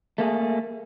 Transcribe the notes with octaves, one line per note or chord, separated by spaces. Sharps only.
A3 A#3 F#4 G#4